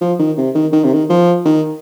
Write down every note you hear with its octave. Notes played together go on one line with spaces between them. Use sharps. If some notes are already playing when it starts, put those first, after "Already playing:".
F3
D#3
C3
D#3
D#3
C3
D#3
F3
D#3